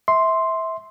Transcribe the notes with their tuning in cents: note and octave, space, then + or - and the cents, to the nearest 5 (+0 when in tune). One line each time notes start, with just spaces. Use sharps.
E5 -20 C6 +0